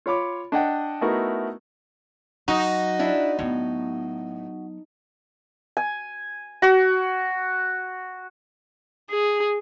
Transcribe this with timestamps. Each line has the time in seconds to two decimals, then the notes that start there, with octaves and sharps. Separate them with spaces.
0.06 F4 C#5 B5 D6
0.52 D4 D#5 F#5 G5
1.01 A3 B3 D#4 E4 F#4 A#4
2.48 F#3 D#4 F#4
2.99 D4 E4
3.39 A2 F#3 B3
5.77 G#5
6.62 F#4
9.10 G#4